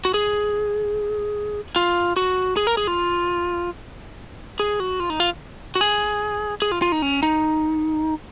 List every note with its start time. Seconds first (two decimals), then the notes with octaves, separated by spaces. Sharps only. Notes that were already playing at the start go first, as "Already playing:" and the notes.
0.05 F#4
0.14 G#4
1.76 F4
2.17 F#4
2.57 G#4
2.67 A#4
2.77 G#4
2.87 F4
4.60 G#4
4.80 F#4
5.00 F4
5.10 D#4
5.20 F4
5.75 F#4
5.81 G#4
6.62 G#4
6.72 F4
6.82 F4
6.92 D#4
7.02 C#4
7.23 D#4